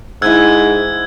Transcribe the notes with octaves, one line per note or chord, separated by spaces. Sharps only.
G#2 E4 D#5 G5 E6 F#6 G#6